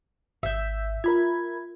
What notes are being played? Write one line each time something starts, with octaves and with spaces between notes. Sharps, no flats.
G#1 E5 G6
F4 A#4 B5 G#6